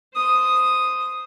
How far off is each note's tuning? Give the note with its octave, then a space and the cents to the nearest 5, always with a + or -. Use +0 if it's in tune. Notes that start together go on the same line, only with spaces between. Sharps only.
C5 -10 D#6 +0